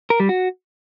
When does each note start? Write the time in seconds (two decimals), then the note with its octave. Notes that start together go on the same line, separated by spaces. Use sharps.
0.10 A#4
0.20 G3
0.29 F#4